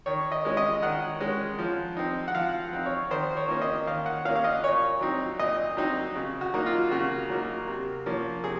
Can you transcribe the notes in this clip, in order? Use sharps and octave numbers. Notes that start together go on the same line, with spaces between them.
D#3 C#5
D#5
G#3 C#4
D#5
D#3 F#5
G#3 C#4
F3
C4 D#4
F#5
F3 F5
C4 D#4
C#5
D#3 C5
C#5
A#3 C#4
D#5
D#3 F5
F#5
A#3 C#4 F5
F5
D#5
A#2 C#5
F#3 C4 D#4
A#2 D#5
F#3 C4 D#4
C#3
F#4
F#3 A#3 D#4
F4
C#3 F#4
F#3 A#3 D#4
C3
F3 A#3 C#4
C3 G#4